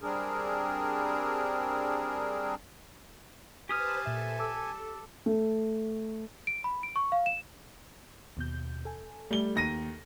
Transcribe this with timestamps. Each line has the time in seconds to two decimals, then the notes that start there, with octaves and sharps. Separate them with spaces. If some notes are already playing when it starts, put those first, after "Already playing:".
0.01 G3 C4 D4 G#4 A#4
3.69 G4 B4 C5 G#5 A5 D#6 F6
4.05 A#2 A4 E5
4.39 A5 D6 E6
5.26 A3
6.47 D7
6.64 B5
6.83 D7
6.96 C#6
7.12 F5
7.26 E7
8.37 D#2 B2 G6
8.85 A4 G#5
9.31 G3 A3 G7
9.55 D#2 A#6 D#7